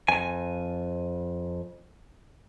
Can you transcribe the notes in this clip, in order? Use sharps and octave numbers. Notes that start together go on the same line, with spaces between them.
F2 G#5